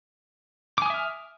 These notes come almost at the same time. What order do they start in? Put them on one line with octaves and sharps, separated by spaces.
D6 G#5 D#6 E5 F6